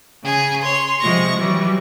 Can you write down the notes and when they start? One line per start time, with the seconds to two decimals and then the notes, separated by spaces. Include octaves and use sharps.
0.23 C#3 G#4 G#5
0.61 C#5 C6
1.00 C3 F3 G#3 C#6 A#6
1.37 E3 F#3 G3